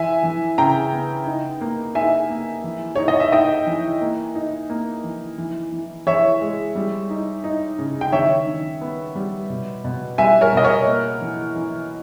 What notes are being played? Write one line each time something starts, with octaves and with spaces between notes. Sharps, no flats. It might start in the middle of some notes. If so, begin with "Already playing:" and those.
Already playing: E3 E5 G#5
E3
C#3 G5 A#5
B3
D#4
A#3
D#4 E5 G#5
A#3
E3
D#4 C#5
D#5
E5
D#4 D#5 G5
E3
A#3
D#4
A#3
E3
E3
E3
E3 C#5 E5
G#3
G3
D#4
D#4
C#3
G5
D#3 C#5 E5
D#3
B3
G3
B2
B2
G3 E5 G#5
A#4 C#5
B2 D#5
A#4 C#5
A#3
E3
E3